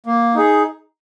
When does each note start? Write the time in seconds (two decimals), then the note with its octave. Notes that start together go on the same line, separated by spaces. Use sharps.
0.06 A#3
0.35 D#4 G#4